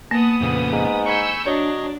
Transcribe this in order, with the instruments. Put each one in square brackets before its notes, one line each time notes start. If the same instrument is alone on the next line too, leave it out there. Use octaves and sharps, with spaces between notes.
[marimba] A#3 [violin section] B3 D#6 [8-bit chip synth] A5
[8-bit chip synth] F2 A#2 C#3
[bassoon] G#2
[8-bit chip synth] G#5 B5 C#6 [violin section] E6 G6 C#7
[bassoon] F#3 [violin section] D4 [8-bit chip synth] C#5 D#5